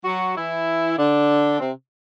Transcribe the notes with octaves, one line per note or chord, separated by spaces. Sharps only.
F#3 F#4
E3 E4
D3 D4
C3 C4